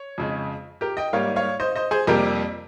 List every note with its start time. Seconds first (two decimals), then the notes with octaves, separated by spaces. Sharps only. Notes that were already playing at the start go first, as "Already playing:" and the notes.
Already playing: C#5
0.18 F2 C#3 G#3
0.81 G4 A#4
0.97 D#5 G5
1.13 G#2 G3 A#3 C#5 F5
1.36 C#5 F5
1.60 C5 D#5
1.76 C5 D#5
1.91 G#4 C5
2.07 F2 C3 G3 A#3 G4 A#4